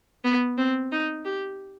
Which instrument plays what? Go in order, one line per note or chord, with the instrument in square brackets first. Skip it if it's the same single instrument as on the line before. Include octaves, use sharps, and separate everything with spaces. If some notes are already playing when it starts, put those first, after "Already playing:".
[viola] B3
C4
D#4
G4